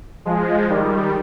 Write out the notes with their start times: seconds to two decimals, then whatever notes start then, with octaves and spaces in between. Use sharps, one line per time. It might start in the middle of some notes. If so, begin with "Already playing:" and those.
0.25 F3 G#3
0.69 D#3 G3